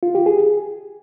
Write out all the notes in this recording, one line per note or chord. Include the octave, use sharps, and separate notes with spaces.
F4
G4
G#4